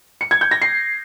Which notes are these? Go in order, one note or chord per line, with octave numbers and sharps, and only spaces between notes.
C#7
G#6
G6
A#6
C7